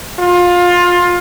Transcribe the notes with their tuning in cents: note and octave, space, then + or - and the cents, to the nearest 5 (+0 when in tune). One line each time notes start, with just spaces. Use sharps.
F4 +20